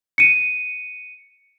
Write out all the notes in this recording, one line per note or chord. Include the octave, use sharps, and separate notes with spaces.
C#7 D#7